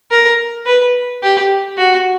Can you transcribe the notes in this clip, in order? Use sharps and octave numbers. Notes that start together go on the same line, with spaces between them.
A#4
B4
G4
F#4